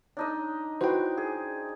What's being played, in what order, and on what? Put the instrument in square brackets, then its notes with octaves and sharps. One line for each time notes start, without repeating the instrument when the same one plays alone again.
[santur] D4 D#4 D#5
[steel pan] E4 F#4 B4 [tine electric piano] C5 G5
[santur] G#4